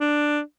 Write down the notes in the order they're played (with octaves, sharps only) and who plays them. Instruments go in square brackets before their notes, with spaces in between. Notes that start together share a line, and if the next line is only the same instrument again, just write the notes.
[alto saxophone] D4